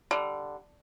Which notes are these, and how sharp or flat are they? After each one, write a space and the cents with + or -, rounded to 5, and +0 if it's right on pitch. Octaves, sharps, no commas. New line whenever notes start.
D3 +5 G3 +0